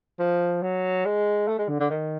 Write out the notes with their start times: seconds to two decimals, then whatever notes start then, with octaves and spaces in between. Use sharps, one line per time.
0.19 F3
0.63 F#3
1.05 G#3
1.48 A3
1.59 G#3
1.69 D3
1.80 D3
1.90 D#3